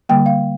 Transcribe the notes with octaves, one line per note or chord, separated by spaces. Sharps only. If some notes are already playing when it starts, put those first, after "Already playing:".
D3 G3 A#3 G5
F5